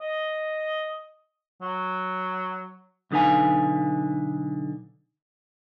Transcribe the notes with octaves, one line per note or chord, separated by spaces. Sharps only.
D#5
F#3
B1 D3 D#4 B4 F5 G#5